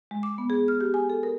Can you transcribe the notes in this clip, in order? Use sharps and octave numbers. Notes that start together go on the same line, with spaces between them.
G#3
D6
B3
G#4
F6
G4
G#5
A4
A#4